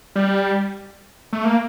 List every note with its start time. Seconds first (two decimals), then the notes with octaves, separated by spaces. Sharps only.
0.16 G3
1.33 A3
1.45 A#3